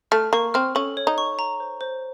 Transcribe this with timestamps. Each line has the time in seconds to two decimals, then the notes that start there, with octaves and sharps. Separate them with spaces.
0.11 A3 F6
0.33 A#3 C#6
0.54 C4 F6
0.75 C#4 A4
0.97 C#5
1.07 D#4
1.18 C#6
1.39 A#5
1.60 C5
1.81 C5